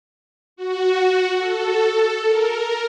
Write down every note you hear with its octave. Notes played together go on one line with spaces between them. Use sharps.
F#4
A4
A#4